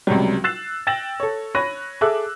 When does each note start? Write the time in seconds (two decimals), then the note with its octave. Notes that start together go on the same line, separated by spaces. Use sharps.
0.07 C#2 C3 F#3 G3
0.44 E6 F#6 A6 C7 E7
0.87 G5 E6 A6 A#6 E7 F#7
1.20 A4 C#5
1.55 C#5 B5 F#6 A#6 D#7
2.01 G#4 A4 E5 D6 E6 F#6